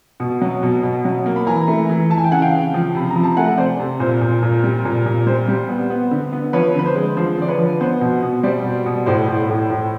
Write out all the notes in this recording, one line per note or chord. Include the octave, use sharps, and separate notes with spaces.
B2
F#3
B2
B2
F#3
A#3
B5
E3 G#5 A#5
A3
E3
E3 A5
G#5
G5
C#3 F#5 G#5
F5 G5
C#3
F3
C3 B5
A#5
F3
A5
A3 F#5 G#5
C3 C5 D5
C3
A#2 C5
A#2
A#2
G3
A#2
A#2
G3 C5
G3
B3
B3
D3
B3
F3 B4 C#5
D3 B4
C5
G#3
F3 C5
D3 D5
B4 C#5
F3
B3 C5
B2
B2
G3 C5 D5
B2
B2
A2 C5 D5
A2
A2
A2